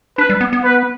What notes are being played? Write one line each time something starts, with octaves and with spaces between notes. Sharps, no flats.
D4 B4
G3
B3
B3
B4